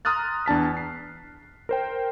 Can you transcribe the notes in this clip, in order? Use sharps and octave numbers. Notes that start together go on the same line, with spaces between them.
A#5 C6 D#6 F6 F#6 A6
E2 D4 A5 B6
C7
A#4 C5 G5